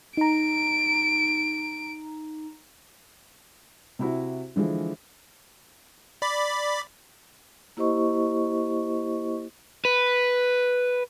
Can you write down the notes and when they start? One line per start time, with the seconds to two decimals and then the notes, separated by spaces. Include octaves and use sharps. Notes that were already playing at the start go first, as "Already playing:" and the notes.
0.17 D#4 A#5 D7
3.99 C3 E4 F#4
4.56 D3 E3 F3 G#3
6.22 D5 B5
7.77 A#3 E4 G4 C5 D#5 C#6
9.85 B4